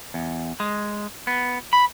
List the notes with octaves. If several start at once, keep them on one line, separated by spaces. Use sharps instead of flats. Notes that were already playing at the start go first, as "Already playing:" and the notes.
E2
G#3
B3
B5